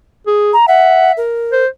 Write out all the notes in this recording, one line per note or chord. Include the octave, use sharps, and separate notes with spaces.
G#4
A#5
E5 F#5
A#4
C5